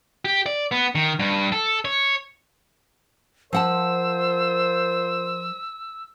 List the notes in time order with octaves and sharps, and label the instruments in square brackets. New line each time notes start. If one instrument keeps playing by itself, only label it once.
[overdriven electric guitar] G4
D5
B3
D#3
G2
A4
C#5
[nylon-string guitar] F3 F#5 A5 [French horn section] F4 A#4 C5 [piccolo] E6